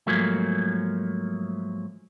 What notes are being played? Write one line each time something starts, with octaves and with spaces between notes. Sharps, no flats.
G#2 F3 F#3 A3 A#3